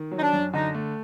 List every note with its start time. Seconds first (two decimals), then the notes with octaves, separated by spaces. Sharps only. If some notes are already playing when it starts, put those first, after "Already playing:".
Already playing: D#3
0.11 F#3
0.17 D#4
0.22 D4
0.33 F#2
0.53 D3 D#4
0.74 A3